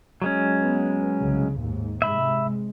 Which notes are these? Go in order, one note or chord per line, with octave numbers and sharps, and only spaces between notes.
F#3 G#3 C#4
B3
C2 C#3
D#2 G#2
G#2 C3 G#3 E5 B5